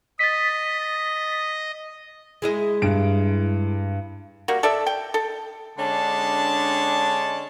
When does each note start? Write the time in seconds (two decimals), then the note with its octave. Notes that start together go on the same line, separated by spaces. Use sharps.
0.19 D#5 A6 B6
2.42 G#3 E4 D#5
2.82 G2 D7
4.48 G3 A#3 F#4
4.63 A4 D5 E5
4.86 G5
5.14 A4
5.78 D3 G#3 C#4 D4 A5